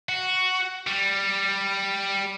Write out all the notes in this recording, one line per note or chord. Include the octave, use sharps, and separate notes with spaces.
F#4
G3